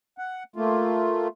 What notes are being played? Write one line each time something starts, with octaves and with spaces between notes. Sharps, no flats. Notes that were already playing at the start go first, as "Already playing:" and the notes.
F#5
A3 A#3 F4